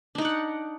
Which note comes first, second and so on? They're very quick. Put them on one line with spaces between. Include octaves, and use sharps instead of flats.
D4 D#4 D5 F#5